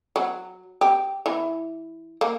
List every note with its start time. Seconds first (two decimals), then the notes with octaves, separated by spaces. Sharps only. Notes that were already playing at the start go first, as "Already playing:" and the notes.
0.16 F#3
0.81 G4
1.26 E3
2.21 A#3